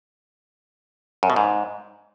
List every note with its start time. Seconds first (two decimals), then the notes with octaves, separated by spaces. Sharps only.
1.23 F#2
1.30 B2
1.36 G#2